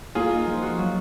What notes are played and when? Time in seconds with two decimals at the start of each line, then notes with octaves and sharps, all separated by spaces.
0.15 A#3 F4 G#4
0.31 D#4
0.46 F3
0.62 F#4
0.78 F#3